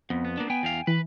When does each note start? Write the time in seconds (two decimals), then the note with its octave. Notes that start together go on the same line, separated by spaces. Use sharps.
0.10 F2 B3
0.25 B3
0.37 A#3 D4
0.50 B3 G5 G#5
0.63 E2 F5
0.87 E3 B4